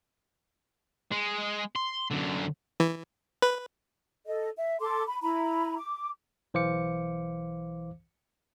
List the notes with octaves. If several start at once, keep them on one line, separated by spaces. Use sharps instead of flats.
G#3
C6
F#2 D3
E3
B4
A4 D#5
E5
A4 C6 D6
B5
E4 A#5 B5
D6
B1 E3 C5 F5 D6 C#7